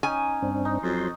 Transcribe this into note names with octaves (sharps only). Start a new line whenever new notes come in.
C#4 D#4 G#5
G2 C4 D4
D#4
F2 F#3 C6